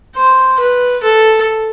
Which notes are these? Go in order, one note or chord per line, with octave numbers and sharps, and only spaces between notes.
C5
B4
A4